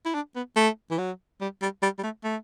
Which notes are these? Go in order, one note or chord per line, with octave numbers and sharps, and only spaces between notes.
E4
D4
B3
A3
E3
F#3
G3
G3
G3
G3
A3
A3